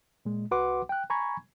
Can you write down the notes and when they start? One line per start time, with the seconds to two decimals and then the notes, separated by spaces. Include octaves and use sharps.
0.25 A#2 G#3
0.51 C2 F#4 B4 F#5 C6 D6
0.89 G5 F#6
1.10 G#5 A#5 B5 C#6 G#6